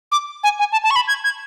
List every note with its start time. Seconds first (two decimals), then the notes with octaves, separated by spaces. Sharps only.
0.12 D6
0.43 G#5
0.59 G#5
0.72 A5
0.84 A5
0.91 C#6
0.96 B5
1.08 G#6
1.24 G#6